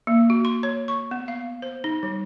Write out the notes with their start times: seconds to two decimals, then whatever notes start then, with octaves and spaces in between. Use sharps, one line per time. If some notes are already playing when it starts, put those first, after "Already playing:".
0.07 A#3
0.30 F#4
0.45 C6
0.63 C#5
0.88 C#6
1.11 B3
1.28 F5
1.62 C5
1.84 D#4
2.03 G3